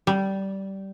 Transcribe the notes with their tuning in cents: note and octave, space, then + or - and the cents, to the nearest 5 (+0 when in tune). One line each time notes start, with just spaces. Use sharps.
G3 -15